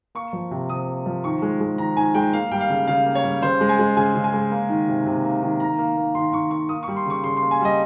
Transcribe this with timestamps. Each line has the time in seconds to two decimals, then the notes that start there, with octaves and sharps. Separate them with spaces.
0.15 A#3 C#6
0.33 F3
0.51 C3
0.69 C3 D#6
0.88 A#3
1.06 F3
1.24 D#3 C#6
1.42 G#3
1.61 G#3
1.78 D#3 A#5
1.97 D#3 G#5
2.14 G#3 G5
2.33 A#3 F5
2.51 G3 G5
2.60 F5
2.70 C#3
2.87 C#3 F5
3.06 A#3
3.15 C#5
3.24 G3
3.42 C#3 C5
3.61 G#3
3.69 G#5
3.79 G#3
3.97 C#3 G#5
4.15 C#3
4.24 G#5
4.33 G#3
4.51 A#3
4.69 D#3
4.87 C3
5.06 C3
5.24 A#3
5.42 D#3
5.60 D#3 A#5
5.78 A#3
5.96 A#3
6.15 D#3 C6
6.33 D#3 C#6
6.51 A#3 C#6
6.69 A#3 D#6
6.83 G3 C#6
6.96 C6
7.06 C#3 C#6
7.24 C#3 C6
7.37 C6
7.42 A#3
7.51 G#5
7.61 G3 D#5